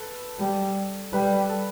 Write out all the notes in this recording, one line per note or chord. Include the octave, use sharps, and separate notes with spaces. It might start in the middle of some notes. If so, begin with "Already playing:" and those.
Already playing: A4 B4
G3
G3 B4
A4